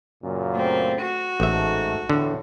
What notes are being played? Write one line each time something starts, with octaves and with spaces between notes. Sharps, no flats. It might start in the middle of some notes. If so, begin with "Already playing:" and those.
F#2 A#2 C#3
A3 C4
F#4
A1 G#2 A3 E5
E2 A2 D3